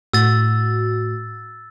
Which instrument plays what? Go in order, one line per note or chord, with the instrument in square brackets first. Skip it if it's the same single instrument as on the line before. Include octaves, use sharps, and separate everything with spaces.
[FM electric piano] A2 F#4 [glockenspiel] E6 A6